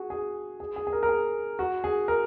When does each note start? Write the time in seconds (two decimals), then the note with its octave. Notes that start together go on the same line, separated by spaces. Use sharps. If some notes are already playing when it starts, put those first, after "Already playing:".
Already playing: F#4 G#4
0.10 G#4
0.60 G#4
0.76 G#4
0.87 G#4
0.93 A#4
1.03 A#4
1.09 G#4
1.59 F#4
1.84 G#4
2.08 A#4